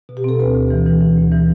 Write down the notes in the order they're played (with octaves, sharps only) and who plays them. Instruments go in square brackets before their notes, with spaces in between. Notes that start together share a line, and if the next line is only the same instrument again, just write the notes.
[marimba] B2
G4
C4 A4
D2 B4
D2
E3
E3
E3
D2
E3